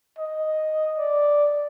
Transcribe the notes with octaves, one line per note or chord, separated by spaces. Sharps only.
D#5
D5